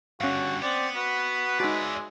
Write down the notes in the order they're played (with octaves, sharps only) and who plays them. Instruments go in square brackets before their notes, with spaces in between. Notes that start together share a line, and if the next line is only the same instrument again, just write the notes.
[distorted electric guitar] G2 D3 [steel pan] C#4 F5 [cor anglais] F#4
[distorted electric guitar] B3 [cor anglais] C4 [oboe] D5
[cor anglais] F#4 [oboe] B4
[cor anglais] G#3 [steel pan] D#4 F#4 [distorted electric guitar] D5 E5